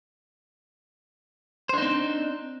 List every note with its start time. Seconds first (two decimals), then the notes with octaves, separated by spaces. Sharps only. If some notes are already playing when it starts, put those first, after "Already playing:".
1.69 C5
1.74 D4
1.78 D#4
1.82 C4